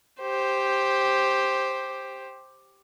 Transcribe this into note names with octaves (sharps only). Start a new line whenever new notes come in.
G4 C5